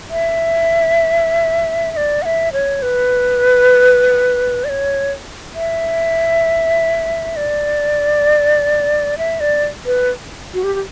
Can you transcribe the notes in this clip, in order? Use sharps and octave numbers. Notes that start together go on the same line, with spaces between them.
E5
E5
D5
F#5
E5
C#5
B4
D5
C#5
E5
D5
E5
D5
B4
F#4
G4
G4